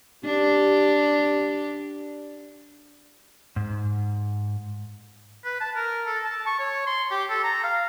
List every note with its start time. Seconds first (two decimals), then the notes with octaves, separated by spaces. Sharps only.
0.25 D4 G4
3.56 G#2
5.45 B4
5.60 A5
5.76 A#4
6.06 A4
6.24 A5
6.46 C#6
6.59 C#5
6.87 C6
7.11 G4
7.30 A4
7.43 A#5
7.64 F5